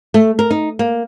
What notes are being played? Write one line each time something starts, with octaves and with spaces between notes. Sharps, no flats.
A3
A#4
D#4
A#3